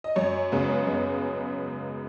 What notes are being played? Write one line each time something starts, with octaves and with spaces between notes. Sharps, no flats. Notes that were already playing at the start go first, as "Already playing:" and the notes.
D#5
F#2 C#5
C#3 G#3 B3
F#2